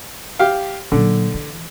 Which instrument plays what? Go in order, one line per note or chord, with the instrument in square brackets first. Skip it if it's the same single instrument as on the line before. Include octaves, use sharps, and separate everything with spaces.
[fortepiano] G4 F5
[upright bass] A#2 F#3 [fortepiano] D3
[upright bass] E3